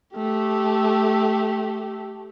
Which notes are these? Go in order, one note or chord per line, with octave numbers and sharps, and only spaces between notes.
A3 G4